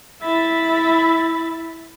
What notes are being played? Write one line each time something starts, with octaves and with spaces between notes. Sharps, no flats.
E4 E5 B5 A6